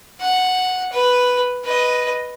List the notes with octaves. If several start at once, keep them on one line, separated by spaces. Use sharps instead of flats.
F#5
B4
B4 D#5